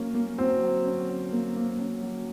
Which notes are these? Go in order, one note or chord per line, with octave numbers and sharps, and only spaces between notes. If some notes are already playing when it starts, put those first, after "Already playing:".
Already playing: F#3 A#3 C#4
A#3
F#3 C4
F#3
C#4
C#4
A#3
A#3
C#4
F#3